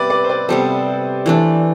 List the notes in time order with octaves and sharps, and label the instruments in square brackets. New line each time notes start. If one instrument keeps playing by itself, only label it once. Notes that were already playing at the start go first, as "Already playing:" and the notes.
Already playing: [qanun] C3 G3 B3 [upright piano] B4 D5 E5
[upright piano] B4 D5
C5
B4 D5
[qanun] C3 G3 B3 [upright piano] A4 C5
[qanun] E3 A3 D4